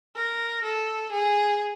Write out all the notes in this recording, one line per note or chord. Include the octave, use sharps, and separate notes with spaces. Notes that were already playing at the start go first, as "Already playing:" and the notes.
A#4
A4
G#4